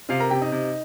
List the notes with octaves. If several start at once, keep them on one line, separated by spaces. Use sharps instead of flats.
C3 F4 F5
A#4 A#5
C3 G4 G5
D#4 D#5
C3